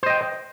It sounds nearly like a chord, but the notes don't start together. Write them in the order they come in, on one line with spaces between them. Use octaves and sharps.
C5 D#5 G5